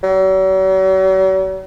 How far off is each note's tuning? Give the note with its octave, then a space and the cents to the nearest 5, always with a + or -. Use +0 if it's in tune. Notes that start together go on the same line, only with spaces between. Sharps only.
F#3 +45